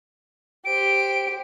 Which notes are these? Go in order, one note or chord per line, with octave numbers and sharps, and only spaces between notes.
G4 C5 D7